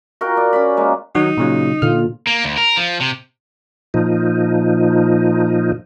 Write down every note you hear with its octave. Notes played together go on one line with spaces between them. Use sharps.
F#4 A#4 F5 G5
D5
C#4 D5 B5
G#3 A#3
D#3 F#3 D#4 F#4
A#2 C#3 F#3
A#2 D3 F4 F6
A#3
D2
A#4
F3
C3
A#2 F3 D#4